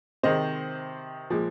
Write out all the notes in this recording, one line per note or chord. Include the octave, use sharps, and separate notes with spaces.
C3 D#3 G#3 C5 D#5
A#2 F3 G#3